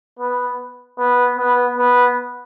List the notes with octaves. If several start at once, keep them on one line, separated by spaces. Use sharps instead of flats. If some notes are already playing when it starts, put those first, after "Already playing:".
B3
B3
B3
B3